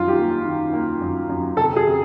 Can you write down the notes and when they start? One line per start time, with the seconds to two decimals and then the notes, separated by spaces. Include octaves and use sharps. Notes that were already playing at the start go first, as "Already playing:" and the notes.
Already playing: F#2 D#3 G3 F4
0.08 G4
0.18 A#3
0.45 D#3
0.73 A#3
1.01 F#2
1.29 F#2
1.57 C3 A4
1.76 G#4
1.86 C3